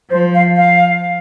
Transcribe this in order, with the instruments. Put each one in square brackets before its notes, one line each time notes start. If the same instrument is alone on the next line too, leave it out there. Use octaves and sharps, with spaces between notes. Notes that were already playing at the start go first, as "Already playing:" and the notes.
[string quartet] F3 [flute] C5
[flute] F5
F5